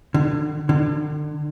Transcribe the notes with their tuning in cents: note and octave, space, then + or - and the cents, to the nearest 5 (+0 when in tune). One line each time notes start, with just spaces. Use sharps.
D3 +35
D3 +35